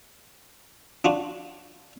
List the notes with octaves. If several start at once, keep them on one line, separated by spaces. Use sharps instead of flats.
D4 F4 F#4